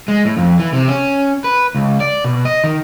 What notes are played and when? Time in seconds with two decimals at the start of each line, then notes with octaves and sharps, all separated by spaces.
0.08 G#3
0.25 A2
0.37 F2
0.59 E3
0.73 C3
0.88 C#4
1.44 B4
1.75 C#2
2.00 D5
2.24 B2
2.45 D#5
2.64 D#3